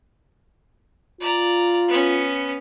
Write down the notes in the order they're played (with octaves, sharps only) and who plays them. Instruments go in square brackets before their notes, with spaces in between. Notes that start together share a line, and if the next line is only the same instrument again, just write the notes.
[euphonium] F4 [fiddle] D5 A#5
[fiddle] B3 C#4